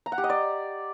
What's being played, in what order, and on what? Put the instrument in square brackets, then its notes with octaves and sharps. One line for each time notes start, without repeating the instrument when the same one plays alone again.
[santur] A#5
F#5
G4
D#5
D5